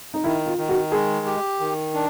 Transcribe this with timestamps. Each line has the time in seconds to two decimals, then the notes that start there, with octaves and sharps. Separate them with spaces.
0.14 D#4
0.24 D#3 E4
0.46 F4
0.58 D#3
0.69 F#4
0.92 G#3 G#4
1.26 G4
1.60 D#3
1.94 D4